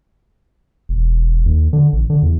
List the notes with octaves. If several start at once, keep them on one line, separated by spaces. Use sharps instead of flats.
E1
D#2
D3
A1
D3
E2